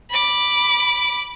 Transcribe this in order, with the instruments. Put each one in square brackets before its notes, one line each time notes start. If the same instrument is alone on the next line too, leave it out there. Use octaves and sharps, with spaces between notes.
[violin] B5 D6